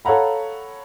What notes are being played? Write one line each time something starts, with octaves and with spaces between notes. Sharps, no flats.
A4 C#5 F5 F#5 A#5 B5